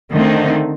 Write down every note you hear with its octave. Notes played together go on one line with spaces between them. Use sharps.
D3 D#3 A3 C4 D#4